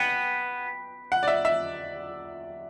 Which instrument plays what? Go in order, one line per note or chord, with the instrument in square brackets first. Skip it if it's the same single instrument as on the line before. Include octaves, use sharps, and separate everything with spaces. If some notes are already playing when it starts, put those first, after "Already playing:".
Already playing: [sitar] B3 [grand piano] G5
[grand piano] F#5
D5
E5
E5